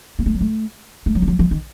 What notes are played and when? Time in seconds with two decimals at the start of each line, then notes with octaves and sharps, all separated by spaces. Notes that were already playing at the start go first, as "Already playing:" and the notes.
0.19 A#3
0.26 A3
0.34 F#3
0.41 A3
1.06 A3
1.15 F#3
1.22 A3
1.28 F#3
1.39 F3
1.51 D#3